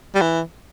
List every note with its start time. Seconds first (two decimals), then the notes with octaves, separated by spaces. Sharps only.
0.15 G3
0.21 E3